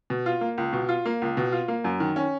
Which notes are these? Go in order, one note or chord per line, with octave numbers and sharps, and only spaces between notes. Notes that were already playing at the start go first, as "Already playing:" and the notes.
B2
F4
A#3
C#2
B2
F4
A#3
C#2
B2
F4
A#3
F#2
D#3
C#4